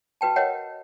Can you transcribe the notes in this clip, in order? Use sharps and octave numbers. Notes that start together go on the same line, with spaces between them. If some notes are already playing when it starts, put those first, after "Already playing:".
F#4 B4 G5 A5
A#4 C#5 D#5 F#5 G5